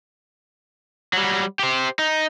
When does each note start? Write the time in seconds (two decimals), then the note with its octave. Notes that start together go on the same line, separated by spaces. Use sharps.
1.13 F#3 G3
1.59 G4 C5
1.99 D#4